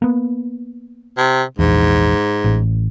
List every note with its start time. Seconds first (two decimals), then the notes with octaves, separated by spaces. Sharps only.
0.02 A#3 B3
1.18 C3
1.59 A#1 E2 G#2
2.44 A1